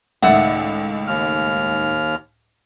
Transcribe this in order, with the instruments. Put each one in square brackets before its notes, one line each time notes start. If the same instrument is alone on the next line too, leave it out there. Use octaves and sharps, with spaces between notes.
[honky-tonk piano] C#2 A2 D#3 [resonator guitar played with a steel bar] D5 E5 F#5
[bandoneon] D#2 F6